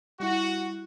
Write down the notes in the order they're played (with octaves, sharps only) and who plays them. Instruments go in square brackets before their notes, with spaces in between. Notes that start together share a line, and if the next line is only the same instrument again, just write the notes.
[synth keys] G3 E4 [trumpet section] F#4